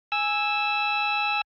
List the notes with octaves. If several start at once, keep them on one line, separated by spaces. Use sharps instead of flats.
G#5 E6